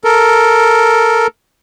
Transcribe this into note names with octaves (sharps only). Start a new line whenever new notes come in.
A4 A#4